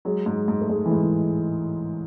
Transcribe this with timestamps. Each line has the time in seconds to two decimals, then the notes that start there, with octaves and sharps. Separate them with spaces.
0.05 F#3 G#3
0.26 G#2
0.48 G#2
0.61 A3
0.69 G#2 G#3
0.86 E3
0.92 G#2
1.02 E3